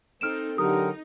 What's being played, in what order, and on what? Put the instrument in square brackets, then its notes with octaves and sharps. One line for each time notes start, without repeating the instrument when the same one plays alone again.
[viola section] C4 D#4 A4 [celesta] F6 D7 E7
[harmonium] D3 A#4 [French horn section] F#3 G4 [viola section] D#4 [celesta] D#6